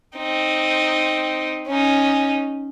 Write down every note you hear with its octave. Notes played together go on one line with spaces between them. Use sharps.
C4 D#4
C#4 D#4